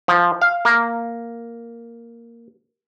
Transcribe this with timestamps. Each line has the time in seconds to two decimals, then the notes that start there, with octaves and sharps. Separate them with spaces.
0.08 F3
0.42 F5
0.65 A#3